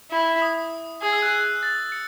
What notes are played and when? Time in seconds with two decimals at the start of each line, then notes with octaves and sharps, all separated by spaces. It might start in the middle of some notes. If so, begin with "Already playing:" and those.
0.11 E4
0.42 D#6
1.02 G#4 D#6
1.13 E6
1.22 F#6
1.63 A6
1.92 C#7